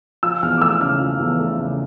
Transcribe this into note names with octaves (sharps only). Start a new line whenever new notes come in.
F3 E6
E2 F6
D6
A3 E6
C#3 F6
F3
E2
A3
C#3